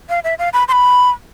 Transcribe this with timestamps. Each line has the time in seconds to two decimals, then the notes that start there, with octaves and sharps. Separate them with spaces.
0.09 F5
0.24 E5
0.39 F5
0.53 B5
0.68 C6
0.72 B5